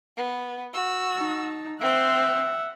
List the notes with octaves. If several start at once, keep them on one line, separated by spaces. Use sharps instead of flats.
B3
F#4 E6
D#4 A5
C4 C5 E5 F#5